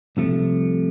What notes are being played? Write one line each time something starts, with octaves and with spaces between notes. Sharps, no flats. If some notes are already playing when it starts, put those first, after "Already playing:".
C2 C3 F3 A3